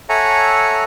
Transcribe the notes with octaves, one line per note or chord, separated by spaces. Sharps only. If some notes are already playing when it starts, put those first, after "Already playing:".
A4 C#5 E5 F#5 G#5 A#5